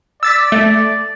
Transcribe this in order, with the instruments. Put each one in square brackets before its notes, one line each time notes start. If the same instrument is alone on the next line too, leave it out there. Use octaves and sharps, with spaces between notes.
[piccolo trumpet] D5 [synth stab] E6 A6 B6
[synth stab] A3